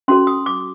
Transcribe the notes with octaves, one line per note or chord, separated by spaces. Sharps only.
C#4 F#4 A4 C6
D#6
D6